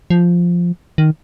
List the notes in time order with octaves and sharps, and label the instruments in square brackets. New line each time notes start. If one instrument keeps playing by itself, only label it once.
[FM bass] F3
D#3